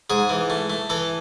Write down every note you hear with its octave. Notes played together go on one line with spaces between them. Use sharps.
G#2 G#4
E3
A3
A3
E3 A4